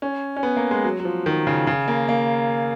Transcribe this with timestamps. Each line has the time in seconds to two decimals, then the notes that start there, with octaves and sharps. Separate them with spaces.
0.02 C#4
0.37 C#4
0.43 B3
0.57 A#3
0.71 G#3
0.84 F#3
1.00 F#3
1.05 F3
1.26 D#3
1.47 C#3
1.67 C#3
1.88 A#3
2.09 A#3